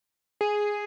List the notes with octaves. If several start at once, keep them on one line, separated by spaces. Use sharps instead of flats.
G#4